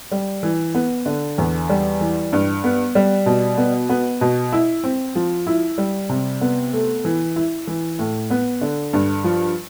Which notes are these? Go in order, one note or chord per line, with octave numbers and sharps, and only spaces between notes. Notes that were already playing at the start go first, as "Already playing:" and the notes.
G3
E3
B3
D3
E2
G3
E3
G2
B3
G3
B2
B3
B3
B2
E4
C4
F3
E4
G3
C3
B3
A3
E3
E4
E3
A2
B3
D3
G2
F3